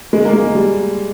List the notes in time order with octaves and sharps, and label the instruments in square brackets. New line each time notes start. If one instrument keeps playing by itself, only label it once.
[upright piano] G#3
A#3
G#3
G3